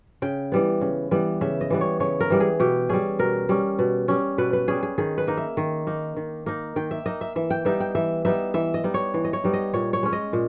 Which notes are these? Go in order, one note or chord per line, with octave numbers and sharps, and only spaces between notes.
C#3 G5
E3 G3 B3
C#3
E3 G3 B3
C#3 E5
D#5
E3 G3 B3
C#5
C#3 C#5
A#4
E3 G3 B3
G#4
B2 G4
G3 C#4 G#4
B2 A#4
G3 C#4
B2
G3 C#4
B2 B4
B4
G3 C#4 G#4
G#4
D#3 G#4
B4
A#3 D#4
E5
D#3
A#3 D#4
D#3
A#3 D#4
D#3 G5
E5
A#3 D#4 D#5
E5
E3 E5
G5
G3 B3 D#4 E5
G5
E3 E5
G3 B3 D#4 E5
E3 E5
D#5
G3 B3 D#4
C#5
E3
D#5
C#5
G3 B3 D#4
D#5
A#2 C#5
C#5
G#3 C#4
D#5
A#2